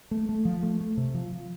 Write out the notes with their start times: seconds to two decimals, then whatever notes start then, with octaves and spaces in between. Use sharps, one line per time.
0.11 A3
0.29 A3
0.45 F3
0.63 A3
0.81 A3
0.97 C3
1.14 F3
1.32 F3